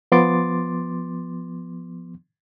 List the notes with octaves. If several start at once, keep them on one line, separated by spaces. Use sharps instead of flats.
F3 B3 C6 D6 A6